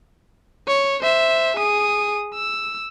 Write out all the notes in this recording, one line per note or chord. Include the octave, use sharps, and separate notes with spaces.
C#5
C5 E5
G#4 D#6
E6